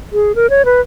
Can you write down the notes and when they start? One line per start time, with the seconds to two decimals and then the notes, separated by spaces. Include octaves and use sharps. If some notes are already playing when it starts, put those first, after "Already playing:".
0.13 G#4
0.35 A#4
0.50 C#5
0.65 B4